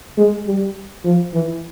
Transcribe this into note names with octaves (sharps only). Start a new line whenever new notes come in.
G#3
G3
F3
E3